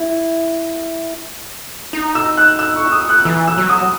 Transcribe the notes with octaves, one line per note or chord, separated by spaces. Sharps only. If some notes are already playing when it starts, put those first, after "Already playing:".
Already playing: E4
D#4
E6
F#6
E6
C#6
D#6
F#6
E3 E6
E6
F#3
D#6